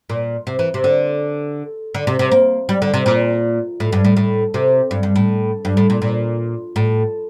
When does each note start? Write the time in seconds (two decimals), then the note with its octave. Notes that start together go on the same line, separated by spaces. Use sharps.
0.10 A#2
0.47 C3
0.59 E3
0.74 C3
0.84 D3
1.95 D3
2.07 C3
2.19 C3
2.32 A#3
2.69 G3
2.82 D3
2.94 C3
3.06 A#2
3.80 A2
3.92 G2
4.05 A2
4.17 A2
4.54 C3
4.91 G2
5.03 G2
5.16 A2
5.65 G2
5.77 A2
5.90 A#2
6.02 A#2
6.76 A2